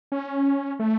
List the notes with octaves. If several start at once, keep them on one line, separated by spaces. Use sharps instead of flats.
C#4
A3